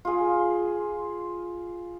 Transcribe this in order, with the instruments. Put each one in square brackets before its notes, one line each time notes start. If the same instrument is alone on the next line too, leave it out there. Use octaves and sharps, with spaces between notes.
[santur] F4 G#4